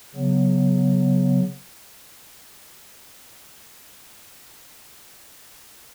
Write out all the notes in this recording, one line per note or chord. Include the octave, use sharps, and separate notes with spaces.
C#3 F#3 B3